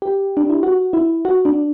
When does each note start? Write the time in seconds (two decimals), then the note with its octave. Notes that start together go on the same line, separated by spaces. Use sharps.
0.02 G4
0.37 D4
0.50 E4
0.63 F#4
0.93 E4
1.25 F#4
1.45 D4